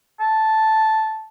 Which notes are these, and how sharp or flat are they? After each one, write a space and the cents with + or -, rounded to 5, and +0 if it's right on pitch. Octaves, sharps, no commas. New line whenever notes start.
A5 -5